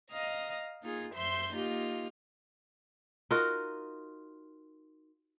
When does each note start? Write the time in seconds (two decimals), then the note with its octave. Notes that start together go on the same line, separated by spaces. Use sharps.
0.11 D#5 F5 A#5 D#6
0.82 A#3 D#4 F4 G#4
1.15 F#2 C5 E5 C6 G6
1.54 A#3 D#4 F4 G4
3.31 D#4 F4 F#4 A#4